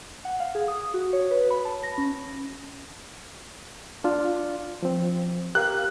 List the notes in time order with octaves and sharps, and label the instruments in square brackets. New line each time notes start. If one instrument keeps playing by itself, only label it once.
[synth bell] F#5
F5
G#4
D#6
F#4
C#5
B4
B5
A5
A#6
C#4
[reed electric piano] D4 F4
F3 C4
[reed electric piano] G4 A#4 F5 [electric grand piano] F#6